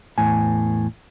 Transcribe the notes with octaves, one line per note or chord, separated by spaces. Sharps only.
E2 A2 G#5